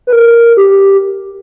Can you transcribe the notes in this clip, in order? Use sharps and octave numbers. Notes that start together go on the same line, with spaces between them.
B4
A#4
G4